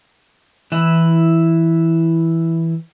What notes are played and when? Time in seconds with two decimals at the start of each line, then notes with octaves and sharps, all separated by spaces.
0.72 E3 E4